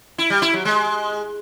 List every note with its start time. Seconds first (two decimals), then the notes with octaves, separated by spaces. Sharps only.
0.18 E4
0.30 G3
0.42 E4
0.54 F#3
0.65 G#3